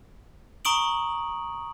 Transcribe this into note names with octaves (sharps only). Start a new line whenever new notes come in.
A#5 C#6 D#6 D7 F#7